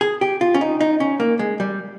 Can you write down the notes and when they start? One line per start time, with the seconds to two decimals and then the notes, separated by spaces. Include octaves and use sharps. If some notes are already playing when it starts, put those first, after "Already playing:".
0.01 G#4
0.21 G4
0.41 F4
0.54 C#4
0.61 D#4
0.81 D#4
1.00 C#4
1.20 A#3
1.39 G#3
1.60 G3